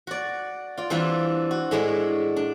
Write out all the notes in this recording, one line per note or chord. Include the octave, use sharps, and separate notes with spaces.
F#4 D5
F4 D5
E3 G3 C4 D4 E4 F4
F#4
A2 G#3 D4 E4 C#5
D4